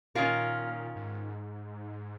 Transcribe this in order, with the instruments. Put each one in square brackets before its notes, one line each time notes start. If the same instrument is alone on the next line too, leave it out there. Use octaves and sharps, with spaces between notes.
[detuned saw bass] A#2 [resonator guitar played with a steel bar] D#3 C#4 F4 A#4
[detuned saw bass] G#2